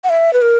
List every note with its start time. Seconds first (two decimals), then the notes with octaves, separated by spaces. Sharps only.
0.04 F#5
0.09 E5
0.33 B4
0.42 A#4